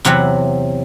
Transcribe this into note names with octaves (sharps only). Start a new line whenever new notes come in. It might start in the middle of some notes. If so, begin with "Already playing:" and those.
E2 C3 F#3 C4 E5 F#5